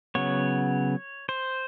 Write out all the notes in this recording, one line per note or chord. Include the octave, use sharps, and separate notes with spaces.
C#3 F#3 B3 C#5
C5